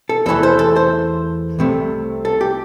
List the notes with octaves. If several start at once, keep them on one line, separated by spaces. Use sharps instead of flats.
A4
E2 E3 A3 A4
C5
A4
C5
C2 C3 A3
A4
G4